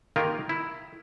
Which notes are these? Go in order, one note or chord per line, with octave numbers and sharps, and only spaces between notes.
D#3 A#3 F4 G4 A#4
E4